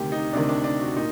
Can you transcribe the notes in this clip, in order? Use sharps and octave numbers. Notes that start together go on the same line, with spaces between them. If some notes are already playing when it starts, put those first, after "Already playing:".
Already playing: D2 C3 D#3 G4
D#4
D2 C3 D#3 D4
D4
D4
F#4
A#2 D#4